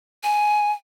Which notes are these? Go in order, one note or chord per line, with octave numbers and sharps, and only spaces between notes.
G#5